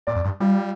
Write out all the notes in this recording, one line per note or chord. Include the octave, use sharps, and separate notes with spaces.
A#2 D5
F2
G2
G3 F4